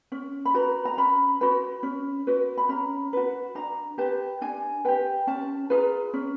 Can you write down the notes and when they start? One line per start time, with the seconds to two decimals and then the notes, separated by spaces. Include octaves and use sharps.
0.12 C#4
0.45 B5
0.54 F#4 B4 A#5
0.85 A#5
0.98 C#4 B5
1.41 F#4 B4 B5
1.83 C#4
2.27 F#4 B4
2.58 B5
2.69 C#4 A#5
3.13 F#4 B4
3.55 D4 A#5
3.98 G4 B4 A5
4.41 D4 G#5
4.85 G4 B4 G5
5.27 C#4 A5
5.70 F4 G#4 B4 A#5
6.14 C#4